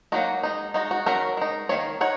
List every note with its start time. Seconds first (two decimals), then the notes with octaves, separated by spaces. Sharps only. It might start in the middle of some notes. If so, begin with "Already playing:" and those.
0.12 F#3 A#3 D#4 F#4
0.43 G#3 D#4
0.74 G#3 D#4 F#4
0.91 F#4
1.06 D#3 F#3 C#4 F#4 A#4
1.37 G#3 D#4
1.69 D#3 A#3 C#5
2.01 D#4 C#5 F#5